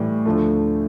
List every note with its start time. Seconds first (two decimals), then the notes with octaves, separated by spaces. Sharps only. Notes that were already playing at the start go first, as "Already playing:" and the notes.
Already playing: A2 E3 G3
0.25 D2 D3 F3 A3